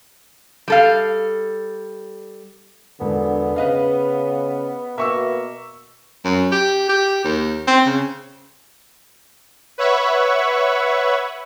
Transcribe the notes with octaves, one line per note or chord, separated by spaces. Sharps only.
G3 A4 F5
E1 D3 B3
C#3 B4 D#5 F5
B2 A#3 E5 C#6 E6
F#2
G4
G4
D#2
C4
C#3
B4 C#5 E5 F#5 B5 C#6